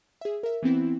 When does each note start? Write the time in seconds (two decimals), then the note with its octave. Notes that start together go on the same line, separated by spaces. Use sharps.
0.21 G#4 E5
0.43 A#4 E5
0.63 E3 B3 C4 E4